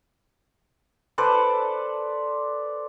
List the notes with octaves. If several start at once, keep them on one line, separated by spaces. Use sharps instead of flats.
A4 B4 C5 D5